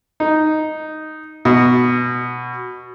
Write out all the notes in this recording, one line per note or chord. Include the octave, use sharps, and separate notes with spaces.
D#4
B2